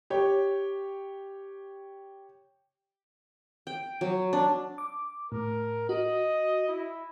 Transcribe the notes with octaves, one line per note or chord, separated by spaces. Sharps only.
G4 C#5
G5
F#3
D4
D6
A2 A#4
F#4 D#5
E4